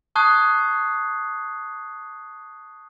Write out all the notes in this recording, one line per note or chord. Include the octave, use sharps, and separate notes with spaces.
A5 C#6 D#6 F#6 G#6 C7